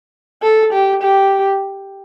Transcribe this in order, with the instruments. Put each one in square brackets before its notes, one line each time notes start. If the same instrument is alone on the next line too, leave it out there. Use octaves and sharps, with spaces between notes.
[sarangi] A4
G4
G4